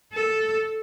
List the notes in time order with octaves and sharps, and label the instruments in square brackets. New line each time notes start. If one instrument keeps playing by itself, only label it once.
[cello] A4